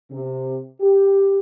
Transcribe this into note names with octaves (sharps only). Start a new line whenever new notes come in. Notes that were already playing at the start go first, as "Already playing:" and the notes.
C3
G4